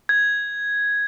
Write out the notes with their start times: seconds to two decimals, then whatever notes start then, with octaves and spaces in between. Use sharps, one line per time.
0.09 G#6